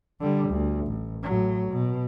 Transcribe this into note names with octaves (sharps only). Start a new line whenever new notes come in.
D3 G3
D2
A1
A2 F#3
B2